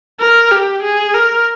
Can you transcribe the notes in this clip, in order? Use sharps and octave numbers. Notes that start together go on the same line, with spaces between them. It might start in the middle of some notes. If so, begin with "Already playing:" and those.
A#4
G4
G#4
A#4